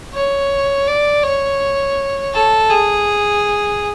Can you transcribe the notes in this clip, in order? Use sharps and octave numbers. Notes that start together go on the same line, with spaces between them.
C#5
D5
C#5
A4
G#4